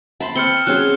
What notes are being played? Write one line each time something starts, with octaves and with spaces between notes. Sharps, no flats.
A5 B5 C6
C4 F6 C#7 G7
F#3 C#4 G#4 F#6